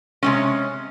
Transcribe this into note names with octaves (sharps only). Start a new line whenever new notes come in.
C3 G#3 C#4